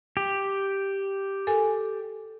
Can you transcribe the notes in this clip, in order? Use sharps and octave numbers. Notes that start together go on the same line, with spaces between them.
G4
A4 A#4 G#5